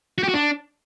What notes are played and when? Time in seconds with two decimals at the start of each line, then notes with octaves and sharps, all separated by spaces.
0.18 F#4
0.23 G4
0.29 F#4
0.34 D4